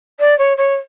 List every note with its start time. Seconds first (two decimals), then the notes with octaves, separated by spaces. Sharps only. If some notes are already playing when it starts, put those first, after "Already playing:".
0.19 D5
0.38 C#5
0.57 C#5